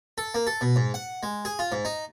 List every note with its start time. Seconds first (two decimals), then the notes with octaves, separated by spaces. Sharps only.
0.18 A4
0.34 A#3
0.47 A4
0.61 B2
0.76 G#2
0.94 F#5
1.23 G#3
1.45 G#4
1.59 F4
1.72 G#2
1.85 D#4